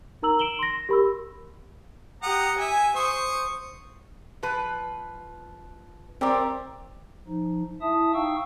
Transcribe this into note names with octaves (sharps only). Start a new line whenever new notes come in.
D#4 A#4 A#5 E6 F#7
D7 E7 F#7 G7
C6 A#6
G4 A#4 B5 C6 E6
G4 F#5 A#5 D#6
E5 G#5
C5 C#6 D#6
F3 B4
G3 C4 G4 A#4 D5
F3 D#4
E4 E5 A5 D#6
D#4 F5 G5 C#6 E6